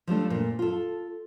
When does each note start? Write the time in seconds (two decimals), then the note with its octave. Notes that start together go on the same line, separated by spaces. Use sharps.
0.07 F3 G3 A3 D4
0.30 A#2
0.59 F4 A4